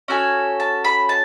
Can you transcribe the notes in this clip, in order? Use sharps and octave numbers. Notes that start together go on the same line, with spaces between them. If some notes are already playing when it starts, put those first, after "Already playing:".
C#4 F#4 A4 G#5
A5
B5
A5